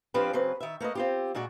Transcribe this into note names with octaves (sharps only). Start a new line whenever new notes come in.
F3 C4 D4 F4 G4 B4
C#3 F#3 C4 B4
D#3 E5
A3 A#3 B4 D#5
C4 F4 G4
A#2 G#3 F#4 D5